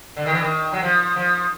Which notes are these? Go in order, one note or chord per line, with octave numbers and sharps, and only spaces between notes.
D3
D#3
E3
D#3
F#3
F3
F3